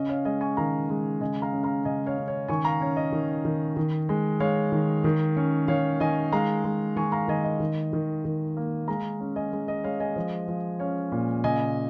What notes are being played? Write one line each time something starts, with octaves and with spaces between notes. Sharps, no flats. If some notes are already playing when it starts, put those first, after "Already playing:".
Already playing: C#3 C#4 D#5
C#5 F5
G#3 D#5 G#5
G#5 C#6
D#3 F5 A#5
G#3
C#3 D#5 G#5
F5 A#5
C#4
F5 A#5
C#3 D#5 G#5
C#5 F5
C#4
C#5
D#3 G#5 C#6
F5 A#5
C#4 C#5
D#5
D#3
D#3
D#3
G#3
G#3 C#5 F5
D#3
D#3
C#4
D#3 C#5 F5
D#3 D#5 G#5
G#3 F5 A#5
G#3
D#3 G#5 C#6
F5 A#5
D#3 D#5 G#5
D#5
D#3
D#3
D#3
A#3
G#3 F5 A#5
C#4
D#5 G#5
G#3
D#5
G#3 C#5 F5
D#5 G#5
F3
F3
C#4 C#5 F5
A#2
C#3 D#5 G#5